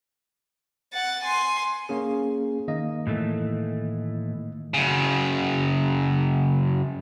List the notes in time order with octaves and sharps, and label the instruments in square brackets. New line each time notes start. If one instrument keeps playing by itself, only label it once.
[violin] F#5 A6
G#5 C6
[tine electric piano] A#3 C#4 G#4
D#3 A#3 D#5
[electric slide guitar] A2 E3 A3
[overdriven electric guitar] F#2 C#3